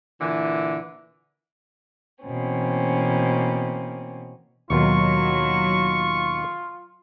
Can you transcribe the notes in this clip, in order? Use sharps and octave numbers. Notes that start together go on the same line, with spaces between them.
A#2 D3 E3
B2 E3 A#3 C4 C#4
D#2 B2 D#3 F#3 F4 C#6